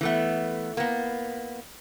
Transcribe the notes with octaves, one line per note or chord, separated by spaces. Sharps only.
E3 A3 B3
A#3 B3